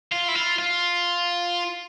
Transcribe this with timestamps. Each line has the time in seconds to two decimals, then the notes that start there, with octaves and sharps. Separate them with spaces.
0.12 F4
0.28 E4
0.35 F4
0.59 F4